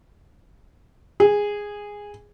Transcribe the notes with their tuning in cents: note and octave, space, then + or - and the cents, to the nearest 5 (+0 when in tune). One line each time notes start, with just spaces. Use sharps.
G#4 -10